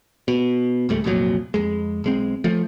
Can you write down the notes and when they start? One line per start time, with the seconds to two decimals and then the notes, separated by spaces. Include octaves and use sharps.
0.28 B2
0.89 C#2 G#2 G3 A3
1.04 C2 F2 A#2 F#3
1.54 F2 G#3
2.04 B1 G#3 C4
2.44 F3 A3